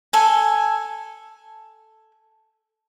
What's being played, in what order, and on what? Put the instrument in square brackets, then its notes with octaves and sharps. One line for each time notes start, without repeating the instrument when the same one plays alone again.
[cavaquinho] A4 G#5